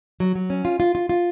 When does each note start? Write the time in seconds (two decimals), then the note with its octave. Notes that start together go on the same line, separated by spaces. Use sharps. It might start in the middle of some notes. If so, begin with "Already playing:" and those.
0.20 F#3
0.35 F#3
0.50 C#4
0.65 F4
0.80 F4
0.95 F4
1.09 F4